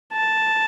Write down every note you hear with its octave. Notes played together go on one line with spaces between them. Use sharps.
A5